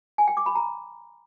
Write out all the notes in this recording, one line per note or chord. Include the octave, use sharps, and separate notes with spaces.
G#5
G5
D6
B5
A#5